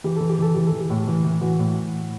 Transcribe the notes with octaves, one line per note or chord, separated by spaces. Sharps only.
E3 G4
E3 A4
G4
E3 A4
E3 G4
A4
E3
G4
A2
E3
E3
E3 F#4
A2